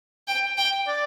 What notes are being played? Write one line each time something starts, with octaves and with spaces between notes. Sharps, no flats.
G5
G5
D5